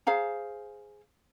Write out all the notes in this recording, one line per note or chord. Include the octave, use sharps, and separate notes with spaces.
G#4 C5 F5 A#5